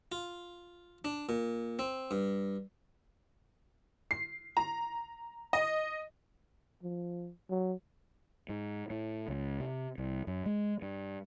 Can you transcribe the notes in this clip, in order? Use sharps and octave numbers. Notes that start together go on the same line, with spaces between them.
F4
D4
A#2
C4
G2
C7
A#5
D#5
F3
F#3
G#2
A2
C#2
C3
C2
F#2
G#3
G2